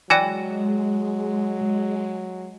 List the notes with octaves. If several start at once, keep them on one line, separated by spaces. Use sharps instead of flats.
E3 F#3 G#3 F#4 D5 G5 G#5